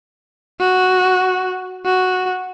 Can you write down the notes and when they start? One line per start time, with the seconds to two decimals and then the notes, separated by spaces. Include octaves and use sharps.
0.60 F#4
1.85 F#4